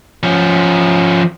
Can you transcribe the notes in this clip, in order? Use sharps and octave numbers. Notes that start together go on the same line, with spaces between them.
F3 C#4